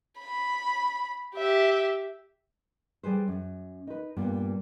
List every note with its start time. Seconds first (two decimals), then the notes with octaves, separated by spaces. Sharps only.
0.19 B5
1.36 G4 E5
3.03 G3 G#4 B4 C5
3.28 F#2
3.87 D#4 B4
4.16 G2 A#2 G3 B3